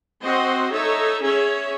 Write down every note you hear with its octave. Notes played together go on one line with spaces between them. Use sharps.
C4 F#4 C5 D#5
D#4 A4 C#5 E5
C#4 G#4 C#5 E5